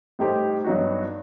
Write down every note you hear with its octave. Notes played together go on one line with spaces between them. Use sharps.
A2 G3 D#4 G4 C5
G2 F#3 B3 D#4 F#4